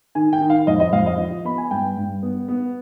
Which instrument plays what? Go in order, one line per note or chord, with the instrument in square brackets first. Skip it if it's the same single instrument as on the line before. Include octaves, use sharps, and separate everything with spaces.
[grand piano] D#3 G#5
G5
D#3
F5
F2 D#5
D#5
F2 F5
D#5
F3
B3 B5
G#5
G2 G5
G2
B3
B3